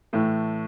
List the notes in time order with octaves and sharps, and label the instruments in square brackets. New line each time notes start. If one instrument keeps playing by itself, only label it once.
[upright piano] A2 E3 A3